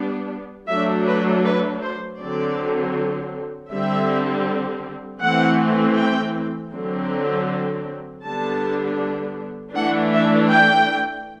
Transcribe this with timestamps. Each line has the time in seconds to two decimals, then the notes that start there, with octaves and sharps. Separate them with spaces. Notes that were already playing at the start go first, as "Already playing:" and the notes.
Already playing: G3 B3 D4
0.69 F#3 A3 D4 E5
1.07 B4
1.45 B4
1.83 C5
2.20 D3 F#3 C4 D5
3.71 D3 G3 C4 E5
5.22 E3 A3 C4 F#5
5.97 G5
6.72 D3 F#3 C4
8.23 D3 G3 B3 D4 A5
9.74 E3 A3 D4 F#5
10.12 E5
10.50 G5